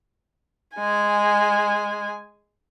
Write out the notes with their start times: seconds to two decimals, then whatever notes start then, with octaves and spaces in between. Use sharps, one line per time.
0.76 G#3 G#5